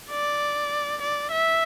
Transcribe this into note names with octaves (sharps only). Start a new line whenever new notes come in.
D5
D5
E5